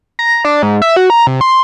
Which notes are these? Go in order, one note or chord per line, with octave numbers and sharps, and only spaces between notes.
A#5
D4
G#2
E5
F#4
A#5
C3
C6